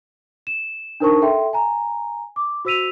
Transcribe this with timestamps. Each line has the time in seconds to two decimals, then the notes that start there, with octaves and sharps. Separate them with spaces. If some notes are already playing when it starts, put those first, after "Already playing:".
0.47 E7
1.00 D4 D#4 A#4 C5 A5 C#6
1.22 A4 E5 G5 C6
1.53 G#5 A#5
2.36 D6
2.65 F#4 C5 E6 B6 D#7 F7